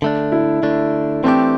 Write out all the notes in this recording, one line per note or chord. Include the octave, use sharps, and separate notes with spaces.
D3 A3 D4
E4
D3 A3 D4
E3 A3 C4 D4 G4